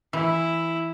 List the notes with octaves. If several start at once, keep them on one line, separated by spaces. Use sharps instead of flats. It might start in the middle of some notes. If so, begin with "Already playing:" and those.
E3 E4